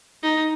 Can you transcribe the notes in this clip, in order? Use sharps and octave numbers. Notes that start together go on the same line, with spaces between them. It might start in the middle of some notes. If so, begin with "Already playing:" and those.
D#4